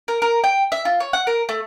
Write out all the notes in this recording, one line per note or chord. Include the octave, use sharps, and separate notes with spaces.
A#4
A#4
G5
E5
F4
C#5
F#5
A#4
A3